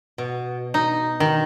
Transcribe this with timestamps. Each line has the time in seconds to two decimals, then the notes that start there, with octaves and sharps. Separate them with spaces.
0.18 B2
0.74 D#4
1.20 D#3